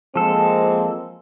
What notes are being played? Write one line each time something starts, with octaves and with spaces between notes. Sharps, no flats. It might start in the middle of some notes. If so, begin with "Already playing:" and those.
F3 G#3 A#3 C4 A4